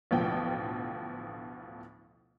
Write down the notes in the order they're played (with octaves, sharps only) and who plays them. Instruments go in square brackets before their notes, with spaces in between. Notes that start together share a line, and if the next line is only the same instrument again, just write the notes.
[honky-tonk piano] A1 D2 B2 F3 G5